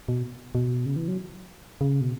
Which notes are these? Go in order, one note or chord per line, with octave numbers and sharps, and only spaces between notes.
B2
B2
C#3
E3
F#3
C#3
B2